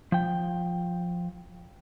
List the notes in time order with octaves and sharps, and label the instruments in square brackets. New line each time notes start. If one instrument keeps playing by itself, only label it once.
[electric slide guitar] F3 G5